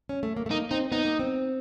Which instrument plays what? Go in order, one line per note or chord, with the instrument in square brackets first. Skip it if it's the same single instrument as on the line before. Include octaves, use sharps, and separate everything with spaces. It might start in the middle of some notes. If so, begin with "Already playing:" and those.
[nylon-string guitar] C#4
A3
A#3
A3
[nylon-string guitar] A#3 [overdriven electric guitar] D#4
[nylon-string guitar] C4 [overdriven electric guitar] D#4
[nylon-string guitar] B3 [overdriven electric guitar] D#4
[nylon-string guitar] A#3
C4